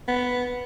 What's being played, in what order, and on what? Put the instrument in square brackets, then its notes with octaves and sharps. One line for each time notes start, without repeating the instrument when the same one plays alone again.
[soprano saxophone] B3